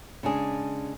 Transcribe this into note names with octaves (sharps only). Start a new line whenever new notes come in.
C#3 G#3 D4 G#4